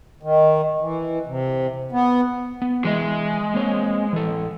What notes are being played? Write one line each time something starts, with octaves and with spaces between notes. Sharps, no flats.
D#3
E3
C3
B3
B3
E3 G#3 D#5 E5
A#3 C4 C#5
E3 A4